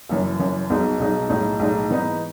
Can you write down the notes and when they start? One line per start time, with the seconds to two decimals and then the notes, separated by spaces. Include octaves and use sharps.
0.09 F#1 F#2 E3
0.39 F#1 F#2 E3
0.70 B1 B2 G#3 D#4
0.99 B1 B2 G#3 D#4
1.29 B1 A2 G#3 D#4
1.59 B1 A2 G#3 D#4
1.90 G#2 E3 B3 D#4